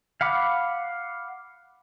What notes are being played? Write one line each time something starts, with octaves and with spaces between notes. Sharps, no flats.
F5 F#5 B5 D6